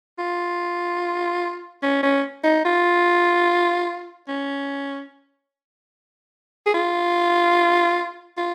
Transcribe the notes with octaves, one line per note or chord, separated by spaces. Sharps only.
F4
C#4
C#4
D#4
F4
C#4
G#4
F4
F4